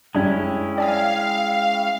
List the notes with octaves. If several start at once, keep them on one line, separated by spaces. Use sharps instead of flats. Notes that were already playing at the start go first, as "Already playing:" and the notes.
F#2 G3 G#3 C#4 D4 E4 G5
D5 F5 G#5 D#6